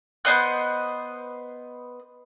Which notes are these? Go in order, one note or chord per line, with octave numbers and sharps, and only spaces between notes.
B3 C5 D#5 F#6